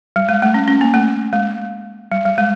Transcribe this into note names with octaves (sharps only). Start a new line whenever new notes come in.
G3
G#3
A3
C#4
C#4
A#3
A3
G#3
G3
G3
G#3